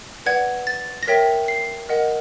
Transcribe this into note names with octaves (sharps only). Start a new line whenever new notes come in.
B4 D5 F#5 G#6
A6
A#6
A#4 C#5 E5 G5 B6
C7
A#4 D#5 F#5